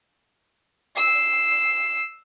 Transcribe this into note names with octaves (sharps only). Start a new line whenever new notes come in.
E6 C7